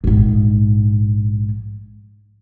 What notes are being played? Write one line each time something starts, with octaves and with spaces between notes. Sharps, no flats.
A#1 G#2